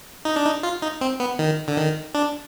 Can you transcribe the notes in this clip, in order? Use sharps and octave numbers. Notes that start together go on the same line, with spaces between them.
D#4
D4
D#4
F4
D#4
C4
B3
D#3
D3
D#3
D4